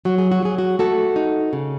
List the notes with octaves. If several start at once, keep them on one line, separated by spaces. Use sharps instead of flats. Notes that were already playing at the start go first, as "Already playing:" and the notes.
F#3 F#4
G#4
F#4
F#3 G#4
F#4
A3 F#4 A4
D#4
C#3